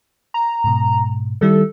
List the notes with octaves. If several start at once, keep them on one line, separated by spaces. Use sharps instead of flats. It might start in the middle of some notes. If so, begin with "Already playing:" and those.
A#5
G#2 B2
D#3 G3 E4 A4